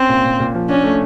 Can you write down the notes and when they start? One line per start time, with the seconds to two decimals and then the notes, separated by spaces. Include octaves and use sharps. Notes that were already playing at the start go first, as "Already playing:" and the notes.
Already playing: C4 C#4
0.09 A#2
0.25 A#2
0.40 A#2
0.55 F3
0.69 C#4 D4
0.84 A3